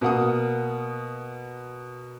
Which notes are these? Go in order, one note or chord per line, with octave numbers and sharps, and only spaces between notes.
B2 A#3 F#5 D#6